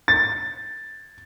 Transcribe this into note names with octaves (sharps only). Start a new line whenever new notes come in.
A6